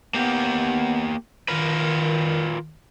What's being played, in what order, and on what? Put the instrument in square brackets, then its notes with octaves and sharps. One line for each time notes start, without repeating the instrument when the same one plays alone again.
[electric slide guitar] A#3 G4 [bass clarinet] B3
[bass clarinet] D#3 [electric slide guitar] F4 A#4 B4